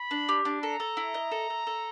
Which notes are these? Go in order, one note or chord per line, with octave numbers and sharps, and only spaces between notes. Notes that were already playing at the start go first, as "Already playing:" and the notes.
Already playing: B5
D4
G4
D4
A4 A#5
A4
E4
D#5
A4
A4
A4